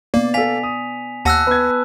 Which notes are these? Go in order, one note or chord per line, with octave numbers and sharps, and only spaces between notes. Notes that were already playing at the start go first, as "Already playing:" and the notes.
A#3 B3 D5
A4 F5 G#5 B6 F7
D#6
D#2 F#5 A5 E6 F#6 A#6
B3 G#6